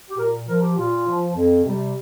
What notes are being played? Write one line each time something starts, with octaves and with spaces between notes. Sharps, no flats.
G4
A#2 A#4
F3 A#4
G4
A#2 F4
F3
F2
C3 G3